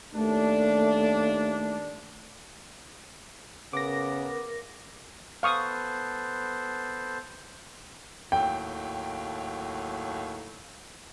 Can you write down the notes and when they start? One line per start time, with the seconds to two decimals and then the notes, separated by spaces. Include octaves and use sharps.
0.14 D#2 A3 D4
3.73 C#3 B3 A#4 D6 A#6
5.43 B3 A4 C5 F5 C#6 D#6
8.32 D#2 A2 F#3 G5